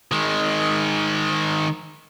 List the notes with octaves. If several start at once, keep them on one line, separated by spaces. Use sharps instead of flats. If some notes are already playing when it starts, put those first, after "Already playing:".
D#3 G#3